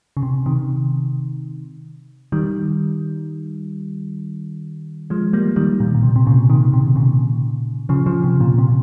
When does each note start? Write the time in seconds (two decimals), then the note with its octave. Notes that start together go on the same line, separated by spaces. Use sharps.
0.17 C#3
0.23 C3
0.46 C3 D#3
2.32 D#3 G3
5.10 F3 G#3
5.33 G3 A#3
5.56 D#3 G3
5.80 A#2
5.94 A#2
6.03 C3
6.16 C3
6.27 A#2 C#3
6.50 C3 D#3
6.73 C3
6.96 A#2 C#3
7.89 C#3 F3
8.06 C#3 F3
8.24 C3
8.41 A#2
8.58 C3